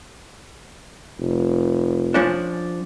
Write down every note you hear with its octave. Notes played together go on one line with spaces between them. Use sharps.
F1
F3 C#4 D4